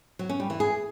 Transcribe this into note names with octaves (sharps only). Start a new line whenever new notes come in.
F#3
C#4
G3
E3
G#4